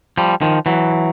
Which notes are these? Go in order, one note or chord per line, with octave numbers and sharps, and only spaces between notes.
F3 G3
D#3 F3
E3 F#3